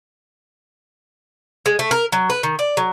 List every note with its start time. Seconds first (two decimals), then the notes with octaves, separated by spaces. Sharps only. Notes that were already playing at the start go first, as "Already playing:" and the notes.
1.66 G#3
1.79 A3
1.91 A#4
2.12 F#3
2.30 B4
2.43 D#3
2.59 D5
2.77 F#3